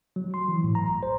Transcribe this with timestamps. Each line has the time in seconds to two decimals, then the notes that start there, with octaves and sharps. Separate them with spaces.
0.16 F#3
0.34 C6
0.48 E3
0.64 A2
0.75 A#5
0.88 G#1
1.03 C5